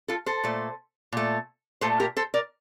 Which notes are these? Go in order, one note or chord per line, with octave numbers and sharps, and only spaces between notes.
F4 A4
A4 C5
A#2 A3
A#2 A3
A#2 A3 A4 C5
G4 A#4
A4 C5
A#4 D5